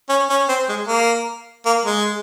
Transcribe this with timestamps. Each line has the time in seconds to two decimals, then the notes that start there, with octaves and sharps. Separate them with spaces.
0.09 C#4
0.29 C#4
0.49 C4
0.68 G#3
0.88 A#3
1.65 A#3
1.85 G#3